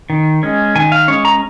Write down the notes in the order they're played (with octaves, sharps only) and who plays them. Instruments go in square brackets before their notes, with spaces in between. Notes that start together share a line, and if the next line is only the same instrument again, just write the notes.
[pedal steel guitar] D#3
G#3 C#4
D#3 G#5
F5
G#3 C#4 C#5
A#5